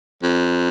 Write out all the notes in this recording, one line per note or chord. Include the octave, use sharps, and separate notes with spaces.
F2